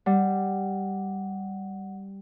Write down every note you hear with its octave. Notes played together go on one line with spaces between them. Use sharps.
G3 F#5